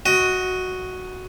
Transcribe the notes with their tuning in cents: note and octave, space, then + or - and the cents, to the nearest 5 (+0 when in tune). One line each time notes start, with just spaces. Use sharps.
F#4 +0 D#5 +20